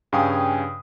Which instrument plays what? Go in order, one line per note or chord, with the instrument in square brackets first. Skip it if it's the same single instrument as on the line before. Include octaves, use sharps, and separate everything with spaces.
[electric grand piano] G2 C#3 F5 G5 G#5 D#6